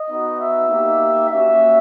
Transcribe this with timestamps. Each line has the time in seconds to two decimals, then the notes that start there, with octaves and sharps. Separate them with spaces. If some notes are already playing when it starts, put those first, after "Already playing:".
Already playing: D#5
0.09 B3 D#4 F#4
0.39 E5
0.68 A#3 D#4 G4
1.28 A#3 C#4 F#4 E5